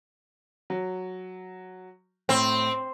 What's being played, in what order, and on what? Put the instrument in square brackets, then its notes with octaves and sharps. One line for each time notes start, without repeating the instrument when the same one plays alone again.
[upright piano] F#3
[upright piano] A2 [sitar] C4